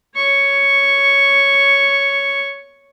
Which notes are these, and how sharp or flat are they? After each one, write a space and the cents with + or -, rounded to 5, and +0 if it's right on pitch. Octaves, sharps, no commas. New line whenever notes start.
C#5 +5 C#6 +0